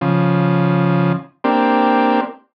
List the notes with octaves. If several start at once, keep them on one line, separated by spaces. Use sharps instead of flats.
C#3 F3
A#3 C4 D4 G4